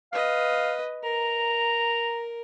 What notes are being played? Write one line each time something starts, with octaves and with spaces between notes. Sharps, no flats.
B4 D#5 F5
A#4 A#5